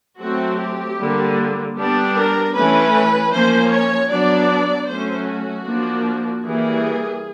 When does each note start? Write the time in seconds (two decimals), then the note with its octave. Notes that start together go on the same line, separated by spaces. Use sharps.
0.19 F#3 A3 C4 F#4
0.58 G4
0.98 D3 G3 A#3
1.76 G3 B3 D4
2.15 A#4
2.54 E3 A3 C#4 B4
3.32 F3 A#3 C#4 C5
3.71 C#5
4.10 F#3 B3 D4 D5
4.88 F#3 A3 C#4 C5
5.28 F#4
5.66 F3 A#3 D4
6.44 E3 G3 A#3 G#4